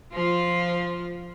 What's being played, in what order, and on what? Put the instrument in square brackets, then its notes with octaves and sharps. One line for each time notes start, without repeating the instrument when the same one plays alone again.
[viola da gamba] F3 F4